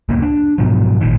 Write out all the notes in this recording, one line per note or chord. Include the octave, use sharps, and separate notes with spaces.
D1 C#2 F#2 A#3
D4
G#2 B2 F3 F#3
G#1 A#2 D#3